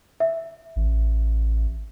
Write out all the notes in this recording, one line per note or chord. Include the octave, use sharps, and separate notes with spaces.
E5
A1